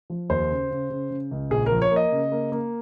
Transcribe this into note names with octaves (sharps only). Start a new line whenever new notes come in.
F3
D#2 C5
C#3
C#3
C#3
C#3
C#2
A#1 G#4
A#4
F3
C#5
A#3
D#5
C#3
A#3
A#3